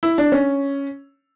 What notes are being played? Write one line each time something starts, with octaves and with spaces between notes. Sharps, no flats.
E4
D4
C#4